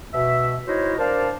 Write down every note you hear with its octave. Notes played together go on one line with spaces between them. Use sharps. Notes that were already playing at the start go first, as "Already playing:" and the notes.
B2 E5
D#4 E4 F#4 A#4 C5 C#5
D4 A#4 C5 D5 F5 A5